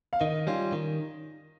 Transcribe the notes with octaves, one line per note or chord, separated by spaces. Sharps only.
F5
D#3 D#5
G3 C#4 F4
D#3